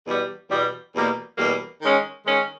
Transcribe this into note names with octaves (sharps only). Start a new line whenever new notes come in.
E2 B2 G3
E2 B2 G3
E2 B2 G3 A#3
E2 B2 G3 A#3
D#3 G#3 C#4
D#3 G#3 C#4